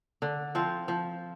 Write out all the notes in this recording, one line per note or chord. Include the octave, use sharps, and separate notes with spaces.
D3
F3 C4 F4
F3